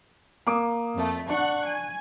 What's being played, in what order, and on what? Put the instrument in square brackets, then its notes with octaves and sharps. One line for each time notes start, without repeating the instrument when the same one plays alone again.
[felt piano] A#3 D6 D#6
[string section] F2 A3
[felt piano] D4 [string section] F#5 C#6 F#6
[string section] G#5